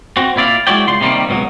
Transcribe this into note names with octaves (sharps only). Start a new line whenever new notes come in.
C4 F#4
A#2 E4 D5 F5
G#3 E4 F#4 C#5 D5 G5
C#2 F4 C6
C3 D#3 G3 A#3
C#2 B2 D#3 F#3